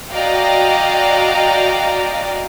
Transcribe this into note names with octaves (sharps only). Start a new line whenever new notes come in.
F#4 D5 D#5 F5 G5 A#5